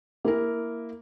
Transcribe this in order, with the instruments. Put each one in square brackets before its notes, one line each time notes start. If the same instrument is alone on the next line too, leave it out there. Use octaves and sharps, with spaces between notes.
[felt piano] A#3 E4 A#4